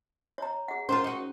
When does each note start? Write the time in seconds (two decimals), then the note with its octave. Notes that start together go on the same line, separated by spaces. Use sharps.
0.38 C#5 A#5
0.68 G#4 F#5
0.89 C#4 F4 A#4 C5
1.04 D#4 F#4